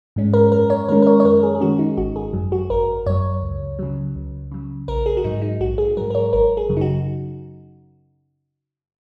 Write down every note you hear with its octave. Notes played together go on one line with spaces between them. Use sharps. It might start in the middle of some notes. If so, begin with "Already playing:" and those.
G#2 G#3 C#4
A#4
F#2 A#4
C#5
D#3 G#3 C#4 A#4
A#4
C#5
C#5
F#2 A#4
G#4
G#4
D#3 G#3 C#4 F#4
D#4
G#1 F#4
G#4
F#2 F#3
F#4
G#1 A#4
F#2 F#3 C#5
C#2
C#3 F#3
C#2
C#3 F#3
A#1 A#4
G#4
F#4
G#2 F#3 D#4
D#4
A#1 F#4
G#4
G#2 F#3 A#4
A#4
C#5
G#1 A#4
G#4
F#2 C#3 F#3
D#4
F#4